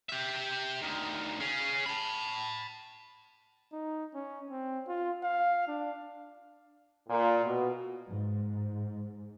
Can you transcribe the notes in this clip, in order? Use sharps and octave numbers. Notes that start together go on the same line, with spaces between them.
G4 E5
D2 D#3
C#4 G#4
A5 B5
D#4
C#4
C4
F4
F5
D4
A#2
B2
G#2